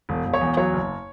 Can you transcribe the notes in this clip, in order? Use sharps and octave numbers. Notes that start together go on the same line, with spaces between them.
E1
E1
C#5
E2
F#3 C#5
F#1